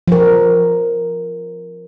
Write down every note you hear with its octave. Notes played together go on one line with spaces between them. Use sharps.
F3 A#4